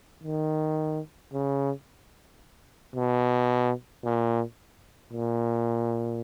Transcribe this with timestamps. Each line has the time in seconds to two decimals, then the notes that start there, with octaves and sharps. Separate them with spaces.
0.24 D#3
1.33 C#3
2.96 B2
4.04 A#2
5.13 A#2